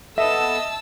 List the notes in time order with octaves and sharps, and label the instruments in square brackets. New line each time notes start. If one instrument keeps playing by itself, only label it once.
[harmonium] B3 A4 [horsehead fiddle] D#5 [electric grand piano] E5 [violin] A5 E6